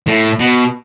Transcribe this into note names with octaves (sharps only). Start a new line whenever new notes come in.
A2
B2